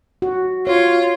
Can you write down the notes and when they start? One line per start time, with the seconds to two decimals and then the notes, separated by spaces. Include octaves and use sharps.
0.22 F#4
0.67 F4 C#5